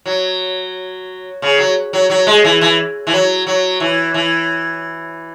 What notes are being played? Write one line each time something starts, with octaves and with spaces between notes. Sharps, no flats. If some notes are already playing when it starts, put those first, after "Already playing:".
F#3
C#3
F#3
F#3
F#3
G#3
E3
E3
E3
F#3
F#3
E3
E3